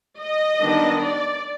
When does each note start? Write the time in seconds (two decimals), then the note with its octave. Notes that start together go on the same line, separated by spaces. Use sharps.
0.20 D#5
0.60 D#3 G3 B3 D4
1.02 D5